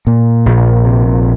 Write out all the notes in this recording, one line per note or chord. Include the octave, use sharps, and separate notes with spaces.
A#2
A#1
C3